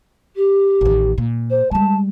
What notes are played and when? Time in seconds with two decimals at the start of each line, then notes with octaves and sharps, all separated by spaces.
0.36 G4
0.81 A1 D#3
1.18 A#2
1.50 C5
1.71 G3 G#3 A5